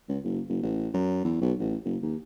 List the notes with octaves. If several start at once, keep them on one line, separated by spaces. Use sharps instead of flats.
C#2
F#1
F#1
A1
F#2
E2
B1
A1
F#1
D#2